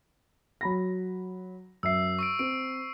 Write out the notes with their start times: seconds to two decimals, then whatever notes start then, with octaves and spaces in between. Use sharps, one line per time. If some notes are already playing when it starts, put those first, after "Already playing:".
0.61 F#3 B5 A#6
1.83 F#2 E5 E6 C7
2.19 C#6 E6 D7
2.39 C4 D7